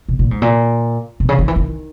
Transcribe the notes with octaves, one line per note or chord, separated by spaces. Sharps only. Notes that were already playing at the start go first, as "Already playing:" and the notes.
B2
A#2
G#2
A#2
B2
C#3
D#3
E3
D#3